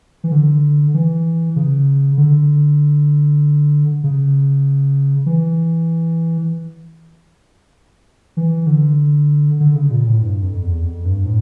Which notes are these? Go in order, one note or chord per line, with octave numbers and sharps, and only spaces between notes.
E3
D3
E3
C#3
D3
C#3
E3
E3
D3
D3
C#3
A#2
A2
G2
F2
E2
F2
G2
A2